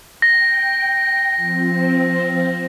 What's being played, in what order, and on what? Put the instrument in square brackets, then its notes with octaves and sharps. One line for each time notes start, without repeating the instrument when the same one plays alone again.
[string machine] G5 [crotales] A#6
[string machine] F3 C4